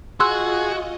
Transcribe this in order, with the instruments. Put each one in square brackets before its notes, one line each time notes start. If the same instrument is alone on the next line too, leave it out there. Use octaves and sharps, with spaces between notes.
[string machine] F4 D#5 [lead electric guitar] F#4 [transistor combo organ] G#4 [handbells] C6 E6 F#6